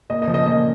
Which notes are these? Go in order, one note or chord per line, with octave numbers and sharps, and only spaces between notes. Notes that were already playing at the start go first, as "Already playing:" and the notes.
A#2 D#5
D#5
F3
D#5
A#2 D#5